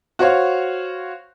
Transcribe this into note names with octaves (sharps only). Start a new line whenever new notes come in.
F#4 C5 C#5 F5